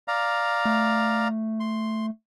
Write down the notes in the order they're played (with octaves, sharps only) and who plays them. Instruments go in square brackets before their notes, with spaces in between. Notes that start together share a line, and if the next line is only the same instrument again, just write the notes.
[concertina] D5 F5 A#5
[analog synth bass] A3
[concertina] C6